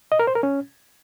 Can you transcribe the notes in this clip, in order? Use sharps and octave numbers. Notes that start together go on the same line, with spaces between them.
D#5
A#4
C5
A#4
C#4